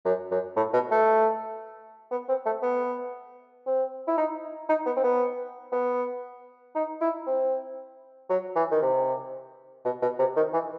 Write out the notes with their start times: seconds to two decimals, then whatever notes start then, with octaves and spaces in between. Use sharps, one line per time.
0.05 F#2
0.31 F#2
0.56 A2
0.73 B2
0.91 A3
2.11 B3
2.28 C4
2.46 A3
2.63 B3
3.67 C4
4.08 E4
4.18 D#4
4.69 D#4
4.86 B3
4.96 C4
5.04 B3
5.72 B3
6.75 D#4
7.01 E4
7.27 C4
8.30 F#3
8.56 E3
8.71 D#3
8.82 C3
9.85 B2
10.02 B2
10.19 C3
10.36 D#3
10.53 E3